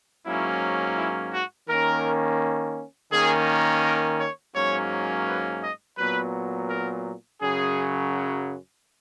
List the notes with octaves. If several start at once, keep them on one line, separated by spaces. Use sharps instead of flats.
G#2 F#3 A#3 C#4 E4
E4
F#4
D#3 A#3 C#4 A#4
D#3 A#3 C#4 G#4
A#4
C#5
G#2 F#3 A#3 C#4 C#5
B4
D#5
A#2 F#3 B3 B4
A#4
F#2 C#3 F#3 G#4